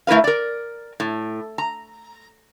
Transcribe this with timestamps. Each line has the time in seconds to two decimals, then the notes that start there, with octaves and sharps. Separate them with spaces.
0.07 A3 E4 A#4 B4 F5
0.24 A#4 D5
1.00 A2
1.58 A#5